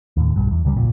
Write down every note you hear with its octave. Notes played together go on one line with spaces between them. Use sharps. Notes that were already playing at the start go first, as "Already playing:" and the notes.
D#2 A2
B1 G2
E2
D2 C#3 G3
F1 A#1 A#2